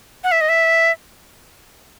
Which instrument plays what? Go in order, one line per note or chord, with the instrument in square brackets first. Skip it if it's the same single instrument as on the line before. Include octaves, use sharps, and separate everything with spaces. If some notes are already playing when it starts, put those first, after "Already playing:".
[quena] F#5
E5
D#5
E5